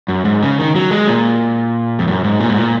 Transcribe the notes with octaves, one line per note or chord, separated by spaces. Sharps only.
F#2
G#2
C#3
D#3
F#3
G#3
A#2
F2
F#2
G#2
A#2
G#2
A#2